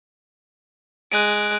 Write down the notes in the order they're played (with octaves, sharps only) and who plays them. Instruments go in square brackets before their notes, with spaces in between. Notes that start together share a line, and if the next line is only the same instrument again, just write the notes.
[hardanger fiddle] G#3 [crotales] F#6 D7